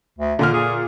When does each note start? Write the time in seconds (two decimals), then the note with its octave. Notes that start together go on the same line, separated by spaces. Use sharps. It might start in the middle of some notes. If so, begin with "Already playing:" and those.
0.19 D2
0.39 A#2 D3 F6
0.53 G#4